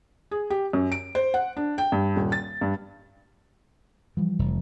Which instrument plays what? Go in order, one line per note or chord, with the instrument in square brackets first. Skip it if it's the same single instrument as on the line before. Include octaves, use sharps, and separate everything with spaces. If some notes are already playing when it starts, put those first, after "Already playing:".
[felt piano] G#4
G4
F#2
D7
C5
F#5
D4
G5
G2
D#1
A6
G2
[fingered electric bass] E3 F3 G3
[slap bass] F1